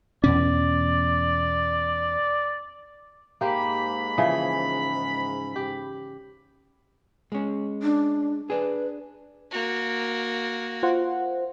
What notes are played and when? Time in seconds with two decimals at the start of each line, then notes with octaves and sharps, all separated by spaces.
0.24 E2 B2 C#4 D5
3.41 G#2 A#3 G4 B5
4.18 C#3 E3 F3
5.56 G4
7.32 G#3 C#4
7.83 D4
8.50 D4 G#4 B4
9.51 A#3 F#4
10.83 F4 C5 F#5